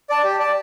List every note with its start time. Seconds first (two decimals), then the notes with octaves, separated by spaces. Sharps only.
0.10 D5 A5
0.24 G4
0.39 D5 A5